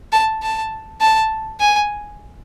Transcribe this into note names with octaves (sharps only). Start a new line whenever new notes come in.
A5
A5
A5
G#5